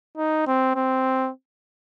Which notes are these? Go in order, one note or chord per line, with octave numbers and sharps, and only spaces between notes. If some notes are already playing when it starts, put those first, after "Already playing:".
D#4
C4
C4